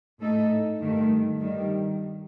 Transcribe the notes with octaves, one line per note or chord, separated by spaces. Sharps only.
A2 A3 D#4 A4
G2 D#3 A3
G2 D#3 G3